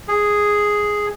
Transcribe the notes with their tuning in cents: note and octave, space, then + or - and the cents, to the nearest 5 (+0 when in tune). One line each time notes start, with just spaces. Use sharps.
G#4 +0